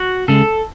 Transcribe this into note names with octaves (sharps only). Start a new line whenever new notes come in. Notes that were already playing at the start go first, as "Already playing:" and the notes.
Already playing: F#4
C#3 G#3 A4